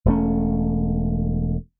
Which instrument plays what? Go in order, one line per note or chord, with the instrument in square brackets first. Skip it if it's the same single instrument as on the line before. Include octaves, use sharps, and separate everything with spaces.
[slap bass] E1 G2 A3 C#4